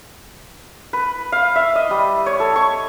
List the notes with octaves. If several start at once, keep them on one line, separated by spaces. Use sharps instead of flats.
B4
F5
E5
D#5
G3
C#5
A4
C#6